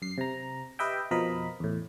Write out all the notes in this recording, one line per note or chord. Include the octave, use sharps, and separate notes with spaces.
F#2 C7
C3 A#5
G4 B4 D#5 E5 G5
F2 B2 F3 A#4 D#5 B5
E2 A2